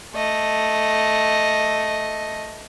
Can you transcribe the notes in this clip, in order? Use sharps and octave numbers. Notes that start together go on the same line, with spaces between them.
A3 D#5